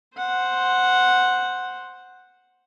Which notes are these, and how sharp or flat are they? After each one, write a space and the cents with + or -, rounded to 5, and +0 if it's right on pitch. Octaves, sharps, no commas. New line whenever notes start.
C5 +0 F#5 -5